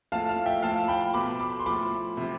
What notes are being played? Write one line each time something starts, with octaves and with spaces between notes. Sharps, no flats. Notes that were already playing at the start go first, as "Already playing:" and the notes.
A2 F3 F5 A5
F5
E5 G5
A2 F3 F5 A5
G5 B5
B2 B5 D6
B5 D6
C6
A2 F3 B5 D6
C3 F3